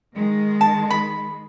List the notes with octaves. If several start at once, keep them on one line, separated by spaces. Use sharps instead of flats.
D#3 G#3
A5
B5